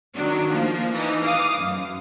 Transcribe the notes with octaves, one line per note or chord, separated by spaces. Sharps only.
D#3 F#3 D4
F3 A#3
E3 D#4
F5 D6 D#6
F#2